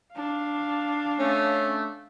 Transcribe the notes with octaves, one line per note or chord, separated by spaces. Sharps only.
D4 F5
A3 C#4